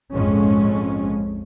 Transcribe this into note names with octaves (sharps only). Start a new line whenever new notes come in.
A#1 F2 G#2 G#3 C#4